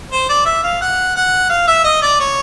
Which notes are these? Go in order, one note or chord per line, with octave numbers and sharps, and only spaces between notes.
C5
D5
E5
F5
F#5
F#5
F5
E5
D#5
D5
C#5